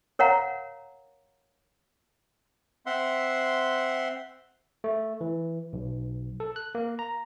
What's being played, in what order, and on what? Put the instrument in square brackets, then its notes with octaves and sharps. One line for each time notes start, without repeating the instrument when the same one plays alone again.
[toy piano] A#4 C#5 F5 F#5 A#5
[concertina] C4 E5 F#5 C6
[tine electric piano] A3
E3
B1
A4
F#6
A#3
A#5